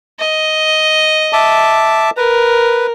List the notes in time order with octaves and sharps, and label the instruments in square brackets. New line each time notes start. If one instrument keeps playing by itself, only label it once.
[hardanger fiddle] D#5
[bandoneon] E5 A5 D6
[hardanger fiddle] A#4 [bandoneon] B4